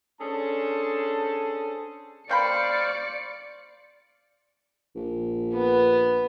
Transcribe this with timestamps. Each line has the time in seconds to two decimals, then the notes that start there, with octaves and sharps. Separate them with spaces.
0.21 C#4 D4 G#4 A4 C5 A5
2.29 A#3 C5 D5 F5 G5 B5 C#6 C#7
4.95 A#1
5.54 B3